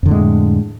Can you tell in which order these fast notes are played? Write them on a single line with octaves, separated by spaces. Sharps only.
F2 D3 A2 G#3